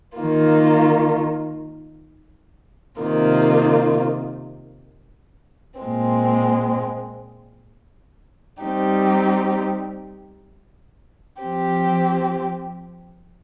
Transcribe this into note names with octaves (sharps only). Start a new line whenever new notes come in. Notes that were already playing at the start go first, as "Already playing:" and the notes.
D#3 A#3 F4
C3 D#3 A#3 F4
A#2 G#3 C4
G3 C4 D#4 G4
F3 C4 G4